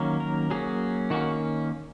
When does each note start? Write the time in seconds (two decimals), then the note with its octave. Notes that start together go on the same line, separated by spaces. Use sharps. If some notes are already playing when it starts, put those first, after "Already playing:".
Already playing: D#3 F#3 A#3 C#4
0.20 A#4
0.51 F#3 A#3 C#4 G#4
1.10 D#3 A#3 C#4 F#4